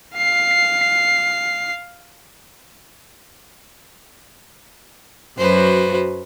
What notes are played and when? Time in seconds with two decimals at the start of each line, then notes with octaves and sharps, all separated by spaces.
0.17 F5 C7
5.38 F#2 F#3 B4 C5